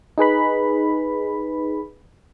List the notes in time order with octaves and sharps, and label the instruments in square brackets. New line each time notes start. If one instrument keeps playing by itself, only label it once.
[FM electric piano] D#4 G#4 B4 B5